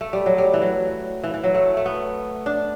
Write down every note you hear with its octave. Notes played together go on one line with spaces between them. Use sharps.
A3
G3
F#3
G3
E3
F#3
E3
E3
F#3
A3
A3
B3
D4